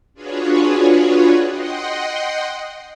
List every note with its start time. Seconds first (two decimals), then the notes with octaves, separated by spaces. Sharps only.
0.14 D4 F4 F#4 G#4 B4 C#5
1.46 D#5 F#5 G5 C6